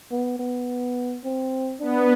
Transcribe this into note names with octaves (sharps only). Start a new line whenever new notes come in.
B3
B3
C4
B3 D4